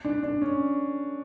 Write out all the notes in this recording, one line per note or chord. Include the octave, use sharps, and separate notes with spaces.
D4
D4
C#4